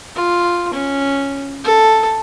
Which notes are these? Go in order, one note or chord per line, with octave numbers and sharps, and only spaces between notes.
F4
C#4
A4